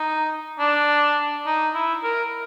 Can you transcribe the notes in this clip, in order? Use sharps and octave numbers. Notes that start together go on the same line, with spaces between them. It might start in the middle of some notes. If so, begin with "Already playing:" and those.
Already playing: D#4
D4
D#4
E4
A#4